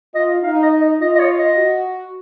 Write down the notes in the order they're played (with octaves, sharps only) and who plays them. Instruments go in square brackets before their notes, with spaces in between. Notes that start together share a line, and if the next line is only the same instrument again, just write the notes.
[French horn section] F4 [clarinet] D#5
[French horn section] D#4 [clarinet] F5
[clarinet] D#5
D#5
[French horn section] F4 [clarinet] D#5
[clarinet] D#5
C#5
D#5
[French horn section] F#4